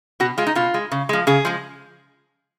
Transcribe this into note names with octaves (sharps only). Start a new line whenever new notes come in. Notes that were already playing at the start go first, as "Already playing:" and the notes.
B2 F#4
G#3 F4
D#4
B2 F4
G#3
C#3
F3 G#3
C#3 G#4
F3 G#3